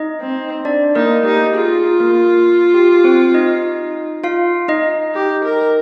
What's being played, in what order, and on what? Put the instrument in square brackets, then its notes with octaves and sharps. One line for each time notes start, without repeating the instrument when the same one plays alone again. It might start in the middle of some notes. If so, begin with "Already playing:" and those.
Already playing: [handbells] D#4 D#5
[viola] C4
[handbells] D4 D5
[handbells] A#3 A#4 [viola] D#4
[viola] D#4 [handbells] G4
[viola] F4 [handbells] G#4
[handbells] A#3 A#4
G4
C4 C5
D#4 D#5
F4 F5
D#4 D#5
[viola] G4
A#4